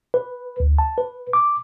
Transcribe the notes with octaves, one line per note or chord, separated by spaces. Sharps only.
B4
D2
A5
B4
D6